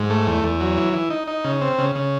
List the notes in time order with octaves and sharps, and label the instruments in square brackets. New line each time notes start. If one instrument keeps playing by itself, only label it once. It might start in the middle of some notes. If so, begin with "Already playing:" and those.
Already playing: [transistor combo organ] G#2
A3
E2
E2
F#3
E3
E3
D#4
D#4
C#3
C4
C#3
C#3